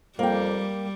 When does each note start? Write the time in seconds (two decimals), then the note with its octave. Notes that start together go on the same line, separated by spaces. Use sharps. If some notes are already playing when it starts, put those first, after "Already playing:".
0.19 F2 G3 A#3 G5